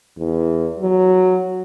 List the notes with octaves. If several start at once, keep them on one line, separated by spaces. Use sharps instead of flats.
E2
F#3